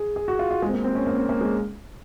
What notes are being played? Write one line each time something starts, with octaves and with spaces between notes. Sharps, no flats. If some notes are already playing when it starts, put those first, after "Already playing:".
Already playing: G#4
G#4
F#4
F4
F4
G#3
C4
A#3
C4
C#4
A#3
C4
A#3
G#3